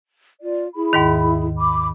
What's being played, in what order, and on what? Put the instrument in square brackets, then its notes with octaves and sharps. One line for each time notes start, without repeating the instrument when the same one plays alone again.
[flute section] F4 D5
E4 G#4 B5
[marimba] D#2 G#2 D#3
[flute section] B5 D6